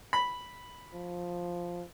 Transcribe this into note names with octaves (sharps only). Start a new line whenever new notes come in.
B5
F3